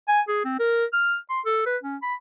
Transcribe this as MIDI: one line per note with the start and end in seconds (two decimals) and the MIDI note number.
0.08 0.21 80
0.28 0.41 68
0.45 0.58 60
0.59 0.85 70
0.93 1.16 89
1.30 1.41 84
1.45 1.62 69
1.66 1.77 71
1.83 1.96 61
2.02 2.14 83